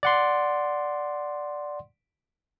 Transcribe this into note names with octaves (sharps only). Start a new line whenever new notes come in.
D5 F#5 C6